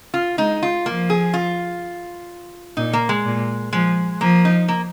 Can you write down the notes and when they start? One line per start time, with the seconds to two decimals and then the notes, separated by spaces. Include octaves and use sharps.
0.14 F4
0.37 G#3 D#4
0.63 F4
0.86 F3 A#3
1.10 G#4
1.34 F4
2.77 A#2 D#4
2.93 A#3
3.09 G#3
3.25 A#2
3.73 F3 G#3
4.21 F3 A#3
4.45 D#4
4.68 A#3